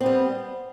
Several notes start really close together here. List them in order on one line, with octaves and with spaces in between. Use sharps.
C4 B3 G3